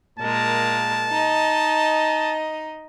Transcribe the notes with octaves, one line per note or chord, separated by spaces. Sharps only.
A#2 G#3 A#4 A5
D#4 D#5